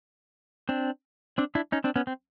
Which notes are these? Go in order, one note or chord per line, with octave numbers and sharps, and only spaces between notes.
C4 D4
C4 D4
D4 E4
C#4 D#4
C4 D4
B3 C#4
C4